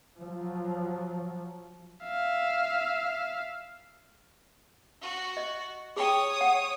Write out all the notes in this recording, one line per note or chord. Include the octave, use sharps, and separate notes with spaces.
F3 F#3
E5 F5
F#4
D#5
G#4 C#5 G5 D#6
F#5